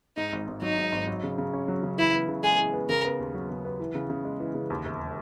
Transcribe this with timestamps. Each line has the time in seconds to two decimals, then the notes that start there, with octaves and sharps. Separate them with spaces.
0.17 G#2 D#4
0.33 G#1
0.48 G#1
0.62 F#3 D#4
0.78 G#2
0.92 G#1
1.07 F#3
1.23 C#3
1.38 C#3
1.54 C#4
1.68 F#3
1.83 C#3
1.98 E3 E4
2.13 B3
2.28 C#3
2.43 G#3 G#4
2.59 E3
2.73 B3
2.89 C#3 A#4
3.05 B3
3.19 D#2
3.35 F#3
3.50 C#3
3.65 B3
3.80 E3
3.95 C#3
4.10 C#3
4.25 G#3
4.40 E3
4.55 C#3
4.70 D#2
4.85 E1